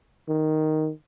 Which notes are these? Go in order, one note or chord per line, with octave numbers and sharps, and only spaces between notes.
D#3